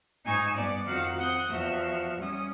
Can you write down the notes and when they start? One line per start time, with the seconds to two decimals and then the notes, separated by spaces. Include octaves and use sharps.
0.24 G#2 D#4 G#5 C#6 E6
0.56 G2 B3 D5
0.86 F2 D#3 F#4 F5 F#6
1.15 C4 F#5 D#6 G6
1.49 E2 F3 F#4 E5 F6
2.18 G3 C#4 D#6